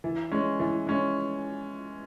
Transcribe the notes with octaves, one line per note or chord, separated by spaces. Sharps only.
E3
G#3 C#4
E3
G#3 C#4